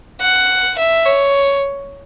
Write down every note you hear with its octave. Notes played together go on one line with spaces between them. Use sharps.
F#5
E5
C#5